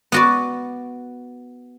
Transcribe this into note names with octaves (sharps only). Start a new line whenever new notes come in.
B3 F#4 D5